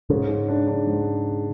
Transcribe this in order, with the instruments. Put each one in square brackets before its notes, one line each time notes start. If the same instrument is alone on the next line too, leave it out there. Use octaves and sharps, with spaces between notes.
[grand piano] G#2 [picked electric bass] C#3
[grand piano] G#2
D4
D4
G#2